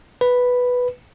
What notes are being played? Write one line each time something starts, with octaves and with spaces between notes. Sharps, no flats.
B4